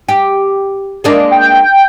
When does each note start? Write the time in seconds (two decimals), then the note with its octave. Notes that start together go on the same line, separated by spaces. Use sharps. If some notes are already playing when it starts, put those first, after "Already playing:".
0.09 G4
1.04 G#3 A#3 D4
1.31 G5